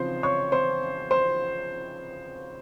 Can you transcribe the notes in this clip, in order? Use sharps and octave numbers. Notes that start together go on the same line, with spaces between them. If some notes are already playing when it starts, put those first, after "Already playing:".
Already playing: C#3 F3 C4 C5 C6
C#5 C#6
C5 C6
C5 C6